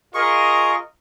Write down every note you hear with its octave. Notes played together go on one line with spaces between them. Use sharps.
F4 G#4 A#4 D#5 C#6